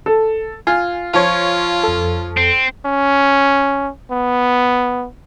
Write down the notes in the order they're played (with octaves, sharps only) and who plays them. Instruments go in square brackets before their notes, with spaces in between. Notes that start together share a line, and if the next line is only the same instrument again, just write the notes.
[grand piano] A4
[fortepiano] F4 [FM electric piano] G#5
[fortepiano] F3 C#5 [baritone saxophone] F4 [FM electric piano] F5
[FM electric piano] F2 A4
[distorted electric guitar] C4
[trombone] C#4
B3